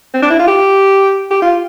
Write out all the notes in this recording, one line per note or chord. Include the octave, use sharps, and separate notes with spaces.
C4
D4
E4
F4
G4
G4
F4